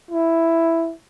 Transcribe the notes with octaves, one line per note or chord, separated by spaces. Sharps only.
E4